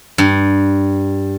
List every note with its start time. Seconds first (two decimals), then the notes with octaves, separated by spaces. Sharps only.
0.18 G2